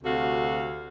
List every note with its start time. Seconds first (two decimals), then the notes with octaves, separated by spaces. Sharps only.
0.04 D2 C3 F#4 A4 F5